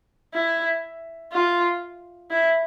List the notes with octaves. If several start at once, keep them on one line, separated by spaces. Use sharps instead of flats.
E4
F4
E4